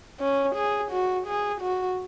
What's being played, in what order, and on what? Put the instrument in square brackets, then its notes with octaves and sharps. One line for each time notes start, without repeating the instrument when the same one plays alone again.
[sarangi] C#4
G#4
F#4
G#4
F#4